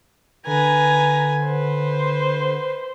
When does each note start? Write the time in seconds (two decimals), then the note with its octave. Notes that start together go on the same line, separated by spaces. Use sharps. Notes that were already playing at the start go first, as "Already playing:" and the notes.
0.47 D3 B4 G#5 A#5
1.45 B4 C5